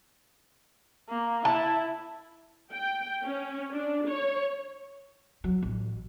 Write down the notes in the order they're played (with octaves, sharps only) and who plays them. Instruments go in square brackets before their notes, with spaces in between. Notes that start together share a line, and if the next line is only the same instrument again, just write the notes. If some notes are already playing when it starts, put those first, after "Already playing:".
[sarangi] A#3
[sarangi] E4 [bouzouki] A5
[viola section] G5
C#4
D4
C#5
[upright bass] F#3
A1